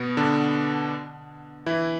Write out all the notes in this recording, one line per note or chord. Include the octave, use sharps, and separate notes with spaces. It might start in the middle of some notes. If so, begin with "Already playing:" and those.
Already playing: B2 B3
D3 D4
E3 E4